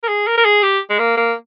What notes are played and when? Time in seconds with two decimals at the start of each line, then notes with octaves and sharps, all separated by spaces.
0.03 A#4
0.08 G#4
0.27 A#4
0.38 A#4
0.45 G#4
0.63 G4
0.90 G#3
0.99 A#3
1.17 A#3